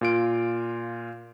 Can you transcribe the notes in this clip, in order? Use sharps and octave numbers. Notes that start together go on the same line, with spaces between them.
A#2 F4 D7